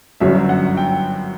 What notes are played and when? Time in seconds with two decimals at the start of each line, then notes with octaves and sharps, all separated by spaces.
0.20 G1 F#2 D3 F#3 C#4 E5
0.49 F#5
0.77 G5